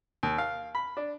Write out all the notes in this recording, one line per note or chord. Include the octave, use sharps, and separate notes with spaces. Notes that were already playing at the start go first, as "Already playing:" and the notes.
D#2
F5
B5
D4